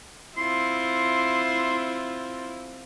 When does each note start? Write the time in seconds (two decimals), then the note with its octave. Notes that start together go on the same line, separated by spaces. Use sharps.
0.38 C4 E4 F4 C6